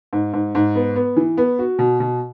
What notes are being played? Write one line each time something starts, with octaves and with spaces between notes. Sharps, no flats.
G#2
G#2
G#2
B3
B3
E3
B3
F#4
B2
B2